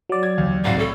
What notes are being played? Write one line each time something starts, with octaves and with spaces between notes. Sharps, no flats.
F#3 D5
G#6
D#2
C2 G#2 F#4 F5
A2 A4